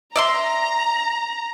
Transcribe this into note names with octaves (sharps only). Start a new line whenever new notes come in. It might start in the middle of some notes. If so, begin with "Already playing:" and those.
D5 E5 A#5 C6